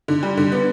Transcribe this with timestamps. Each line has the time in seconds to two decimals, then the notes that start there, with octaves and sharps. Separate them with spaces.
0.08 D3
0.23 G3
0.37 D3
0.52 B3